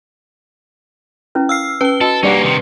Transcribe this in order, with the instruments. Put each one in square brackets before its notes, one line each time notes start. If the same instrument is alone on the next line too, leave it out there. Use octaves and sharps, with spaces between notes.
[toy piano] C#4 E4 B4
[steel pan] F5 [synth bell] E6 F6 C7
[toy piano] C#4 A5 [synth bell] B4 G7
[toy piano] F#4 [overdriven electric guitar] A4 [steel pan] D#5
[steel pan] G3 D5 F#5 [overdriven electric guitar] A#3 C#4 [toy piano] D4 C#6
[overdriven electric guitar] C3 D#3